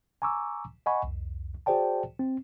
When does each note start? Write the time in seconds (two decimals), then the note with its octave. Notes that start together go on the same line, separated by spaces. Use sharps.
0.22 G#5 A#5 C#6 D6 E6
0.86 D#5 F#5 G#5 B5 C#6
1.04 C2 F2
1.66 F#4 G#4 C5 D5 G5 A5
2.19 C4